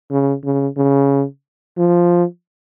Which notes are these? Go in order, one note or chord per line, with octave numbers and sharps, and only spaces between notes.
C#3
C#3
C#3
F3